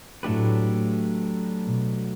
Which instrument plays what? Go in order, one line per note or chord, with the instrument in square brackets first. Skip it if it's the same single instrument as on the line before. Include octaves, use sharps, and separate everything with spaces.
[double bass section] A2 [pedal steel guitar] F#3 A3 D4 G4 B4
[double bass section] B2